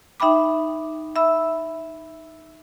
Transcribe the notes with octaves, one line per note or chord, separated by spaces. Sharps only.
D#4 E5 G5 B5 D6
E5 B5 E6